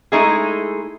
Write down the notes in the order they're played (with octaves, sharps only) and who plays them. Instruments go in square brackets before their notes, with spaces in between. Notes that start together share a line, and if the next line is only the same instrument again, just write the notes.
[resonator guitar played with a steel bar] G#3 A3 D#4 E4 G#4